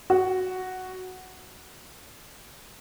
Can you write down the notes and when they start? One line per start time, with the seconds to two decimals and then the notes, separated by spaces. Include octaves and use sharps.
0.10 F#4